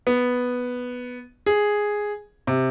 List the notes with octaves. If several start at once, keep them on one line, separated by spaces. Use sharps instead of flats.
B3
G#4
C3